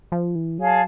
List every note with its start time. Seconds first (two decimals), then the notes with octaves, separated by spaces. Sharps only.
0.12 F3
0.35 E3
0.58 F#3 G#4 C#5 F5 A5